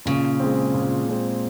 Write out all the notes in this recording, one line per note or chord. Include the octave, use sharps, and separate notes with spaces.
A#2 C#3
G#3 C4
A#2
G#3 C4